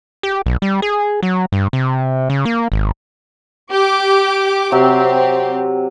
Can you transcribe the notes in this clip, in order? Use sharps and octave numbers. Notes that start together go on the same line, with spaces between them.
G4
B1
G3
G#4
F#3
G2
C3
C#3
A#3
G#1
G4 D6
C3 F#3 C4 G4